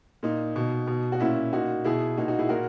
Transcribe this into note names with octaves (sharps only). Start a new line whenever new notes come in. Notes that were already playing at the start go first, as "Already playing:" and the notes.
A#2 D#4
B2
B2
F#4
A#2 C#4 E4
A#2 D#4 F#4
B2 E4 G#4
A#2 D#4 F#4
D#4 F#4
E4 G#4
A#2 F#4 A#4